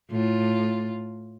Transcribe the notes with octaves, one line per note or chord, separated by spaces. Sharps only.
A2 F4